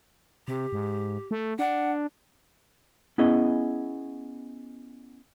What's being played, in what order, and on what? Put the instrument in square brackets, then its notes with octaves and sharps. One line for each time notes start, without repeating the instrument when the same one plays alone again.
[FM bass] C3 [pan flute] G4
[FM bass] G#2
A3
[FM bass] D4 [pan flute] F#5
[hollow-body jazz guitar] B3 C#4 E4 G#4 D#5